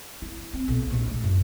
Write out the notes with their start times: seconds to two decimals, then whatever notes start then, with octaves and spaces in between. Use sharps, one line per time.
0.22 E4
0.53 C4
0.68 B1 A#2
0.90 A#1 D#2
1.10 A3
1.24 F#2